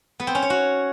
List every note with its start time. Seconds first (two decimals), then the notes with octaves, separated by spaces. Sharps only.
0.20 B3
0.27 C4
0.35 C#4
0.42 C#5
0.50 F#4